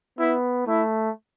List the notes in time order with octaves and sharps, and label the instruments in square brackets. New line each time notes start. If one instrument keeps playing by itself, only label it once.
[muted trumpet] B3 [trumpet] E4
[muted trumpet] A3 [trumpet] E4